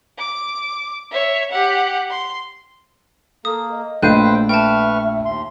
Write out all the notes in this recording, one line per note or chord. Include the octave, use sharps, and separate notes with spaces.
D6
C#5 E5
G4 F#5
C6
A#3 A4 D#6
D#5
A#1 A3 B4 C5 F5 G5 F#6 D#7
B4 E5 G5 A5 C#6 F6
D#2 C6